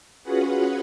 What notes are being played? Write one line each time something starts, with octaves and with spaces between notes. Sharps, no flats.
C#4 F4 F#4 G#4 B4 F#5